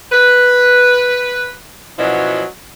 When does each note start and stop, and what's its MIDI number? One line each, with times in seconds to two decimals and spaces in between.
0.12 1.52 71
1.99 2.44 47
1.99 2.44 53
1.99 2.44 54
1.99 2.44 61
1.99 2.44 64